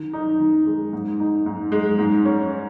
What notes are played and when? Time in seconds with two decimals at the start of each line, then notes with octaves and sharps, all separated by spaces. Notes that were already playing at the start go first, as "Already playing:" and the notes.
Already playing: D#3
0.13 D#4
0.40 D#3
0.66 G#3
0.93 G#2
1.20 D#4
1.46 G#2
1.72 G#3
1.98 G#2
2.25 C#4